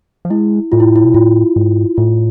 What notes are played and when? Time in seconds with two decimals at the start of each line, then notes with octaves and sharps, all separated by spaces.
0.25 F3
0.30 G#3 E4
0.72 A2 F4
0.80 E4
0.96 E4
1.04 B2
1.14 A2 F4
1.56 G#2
1.97 A2 F4